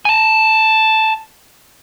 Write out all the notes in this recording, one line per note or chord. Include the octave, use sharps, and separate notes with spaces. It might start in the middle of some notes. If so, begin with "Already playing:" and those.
G#5 A5